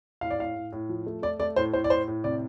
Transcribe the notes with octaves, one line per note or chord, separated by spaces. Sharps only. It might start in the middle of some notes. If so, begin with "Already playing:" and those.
A2 F5
D5
A2 F5
A2
A2
F3
A3
A3 D5
A3 D5
A2 C5
A2 C5
D5
A2 C5
A2
C3 D5